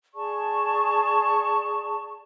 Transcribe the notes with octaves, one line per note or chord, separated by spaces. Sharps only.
G#4 D5 A5 C#6